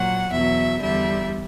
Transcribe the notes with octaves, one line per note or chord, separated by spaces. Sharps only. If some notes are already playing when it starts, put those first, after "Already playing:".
Already playing: A#2 F#3 F#5
E2 B2 F#3 E5
E2 D3 G3 E5